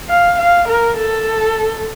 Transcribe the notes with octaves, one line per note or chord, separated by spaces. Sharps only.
F5
F5
A#4
A4